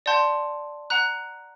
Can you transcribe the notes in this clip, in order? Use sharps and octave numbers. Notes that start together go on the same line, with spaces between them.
D5 F#5 A5 C6 G6
F#5 A#5 F#6